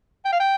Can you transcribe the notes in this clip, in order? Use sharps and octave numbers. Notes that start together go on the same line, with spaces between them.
G5
F5
G5